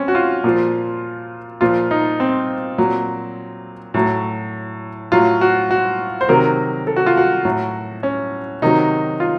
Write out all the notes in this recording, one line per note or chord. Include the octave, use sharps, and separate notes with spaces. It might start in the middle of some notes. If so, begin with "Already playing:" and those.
Already playing: C4 C#4
F#4
F4
A#2 F3
A#2 F3 F4
D#4
C4
A#2 F#3
A2 F#3
A2 F#3 F4
F#4
F#4
C5
C3 D#3 F#3 A#4
A4
F#4
F4
F#4
A2 F#3
C#4
C3 D#3 F#3 D#4
F4